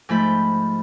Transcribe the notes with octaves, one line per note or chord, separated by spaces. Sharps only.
G#2 F3 A3 B5 G6